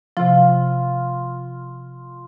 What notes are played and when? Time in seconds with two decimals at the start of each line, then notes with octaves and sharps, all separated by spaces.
0.17 C3 F3 F4